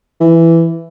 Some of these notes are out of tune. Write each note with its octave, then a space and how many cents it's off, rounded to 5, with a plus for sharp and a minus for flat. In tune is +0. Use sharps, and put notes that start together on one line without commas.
E3 +10